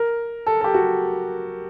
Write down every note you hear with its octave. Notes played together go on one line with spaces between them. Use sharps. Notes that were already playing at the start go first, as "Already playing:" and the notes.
Already playing: A#4
A4
A4
G4
F#4